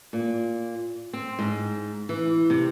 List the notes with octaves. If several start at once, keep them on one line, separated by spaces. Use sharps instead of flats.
A#2
C4
G#2
E3
C3